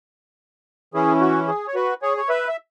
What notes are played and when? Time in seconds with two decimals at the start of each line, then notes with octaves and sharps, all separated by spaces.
0.94 E3 C#4 E4 G#4
1.21 F#4
1.48 G#4
1.67 C#5
1.75 F#4 B4
2.02 G#4 C#5
2.17 C#5
2.29 B4 E5
2.48 E5